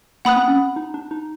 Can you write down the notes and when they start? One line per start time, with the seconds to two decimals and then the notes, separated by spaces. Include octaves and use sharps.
0.25 A#3 F#5 B5 D#6 F#6
0.36 C4
0.48 C#4
0.76 D#4
0.94 D4
1.11 D#4